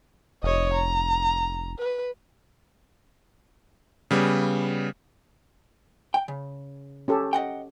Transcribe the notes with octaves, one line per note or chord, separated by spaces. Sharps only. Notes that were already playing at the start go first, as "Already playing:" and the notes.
F1 C#5 D#5
A#5
B4
C#3 G3 B3
G5
C#3
C#4 G4 A4
D#5 F#5 G5